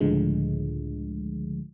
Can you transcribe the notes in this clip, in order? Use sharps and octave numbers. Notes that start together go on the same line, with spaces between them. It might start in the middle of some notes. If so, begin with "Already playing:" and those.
C#2 A2 D3 F3 G#3